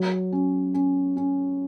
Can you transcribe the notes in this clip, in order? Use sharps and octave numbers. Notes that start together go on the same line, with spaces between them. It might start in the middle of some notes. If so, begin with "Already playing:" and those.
Already playing: F#3
C#4
C#4
C#4